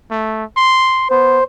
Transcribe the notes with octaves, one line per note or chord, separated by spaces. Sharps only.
A3
C6
B3 C5